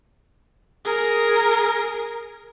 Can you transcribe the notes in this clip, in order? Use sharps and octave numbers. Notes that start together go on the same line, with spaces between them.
G#4 A#4